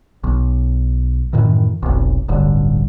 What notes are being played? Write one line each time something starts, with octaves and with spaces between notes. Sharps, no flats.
B1
F#2 A2 D#3 E3
F1 B1
D1 A1 G2 D3